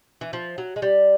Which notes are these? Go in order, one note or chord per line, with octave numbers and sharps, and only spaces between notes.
E3
F3
F#3
G#3
G3